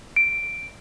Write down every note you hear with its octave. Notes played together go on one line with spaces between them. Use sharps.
D7